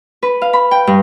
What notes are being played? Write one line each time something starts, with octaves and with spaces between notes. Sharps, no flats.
B4
F5
B5
G5
G2